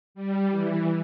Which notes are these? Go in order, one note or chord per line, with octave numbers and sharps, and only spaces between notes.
G3
E3